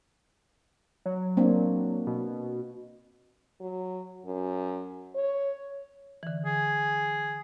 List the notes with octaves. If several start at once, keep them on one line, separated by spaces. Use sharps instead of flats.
F#3
A#3 C4 D4
B2
F#3
F#2
C#5
D3 E3
G#4